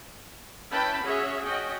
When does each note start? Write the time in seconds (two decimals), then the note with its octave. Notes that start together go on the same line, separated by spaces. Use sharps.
0.71 C#4 E4 B4 G5 A5 B5
1.02 C#4 F#4 G#4 C#5 E5
1.44 C#4 F#4 D#5 G5